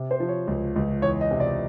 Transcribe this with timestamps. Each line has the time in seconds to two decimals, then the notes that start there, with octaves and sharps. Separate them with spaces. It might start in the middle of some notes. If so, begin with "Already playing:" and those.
Already playing: C3
0.11 C5
0.20 F3
0.29 C#5
0.47 C#2
0.76 C#2
1.02 E2 C#5
1.21 D#5
1.31 C3
1.40 D5